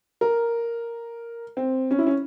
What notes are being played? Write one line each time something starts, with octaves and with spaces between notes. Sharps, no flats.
A#4
C4
C#4
E4
C#4